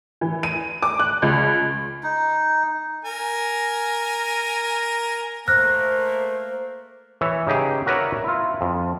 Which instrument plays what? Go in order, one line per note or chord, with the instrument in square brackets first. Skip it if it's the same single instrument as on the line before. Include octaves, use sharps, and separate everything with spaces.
[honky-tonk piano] E3
D#7
D6
F#6
C#2
[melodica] D#4
[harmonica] A#4 G#5
[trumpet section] A3 A#3 A#4 [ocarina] C5 [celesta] F6 F#6 A#6
[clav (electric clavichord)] E3 C#5 E5
C#3 D#4 G4 G#4
F#4 A#4 B4 C#5 D5 E5
E4 F4
F2